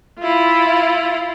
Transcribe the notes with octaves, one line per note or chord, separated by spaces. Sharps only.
E4 F4